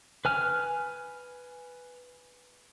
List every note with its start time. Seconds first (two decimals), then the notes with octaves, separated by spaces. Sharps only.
0.25 B4 G#5 F6